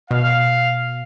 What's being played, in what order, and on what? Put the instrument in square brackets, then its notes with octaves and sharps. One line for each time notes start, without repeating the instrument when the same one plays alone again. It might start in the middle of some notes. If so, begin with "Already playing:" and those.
[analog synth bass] B2 [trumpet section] F5